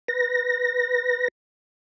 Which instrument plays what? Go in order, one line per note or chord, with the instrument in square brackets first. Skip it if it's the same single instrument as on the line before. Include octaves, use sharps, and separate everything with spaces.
[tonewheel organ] B4 A#6